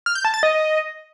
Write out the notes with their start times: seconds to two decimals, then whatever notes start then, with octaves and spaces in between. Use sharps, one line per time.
0.06 F6
0.15 G6
0.25 A5
0.34 A6
0.43 D#5